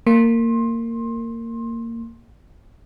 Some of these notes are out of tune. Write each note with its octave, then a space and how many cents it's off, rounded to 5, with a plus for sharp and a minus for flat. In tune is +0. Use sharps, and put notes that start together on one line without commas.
A#3 -20 C6 +25